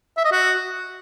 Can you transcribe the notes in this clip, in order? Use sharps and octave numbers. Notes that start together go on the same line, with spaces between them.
E5
D#5
F#4